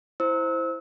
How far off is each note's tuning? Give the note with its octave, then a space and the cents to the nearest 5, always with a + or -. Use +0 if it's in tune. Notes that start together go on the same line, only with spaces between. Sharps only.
E4 +0 C5 +0 E6 -30